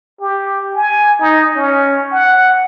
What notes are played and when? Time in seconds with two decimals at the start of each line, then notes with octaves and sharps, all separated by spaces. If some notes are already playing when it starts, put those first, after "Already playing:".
0.20 G4
0.75 G#5
1.20 D#4
1.55 C#4
2.12 F#5